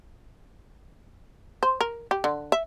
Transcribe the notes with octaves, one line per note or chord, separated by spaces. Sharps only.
C5
A#4
G4
D3
E5